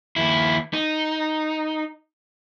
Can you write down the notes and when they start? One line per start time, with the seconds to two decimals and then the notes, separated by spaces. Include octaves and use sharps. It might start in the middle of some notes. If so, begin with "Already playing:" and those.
0.16 D#2 E4
0.73 D#4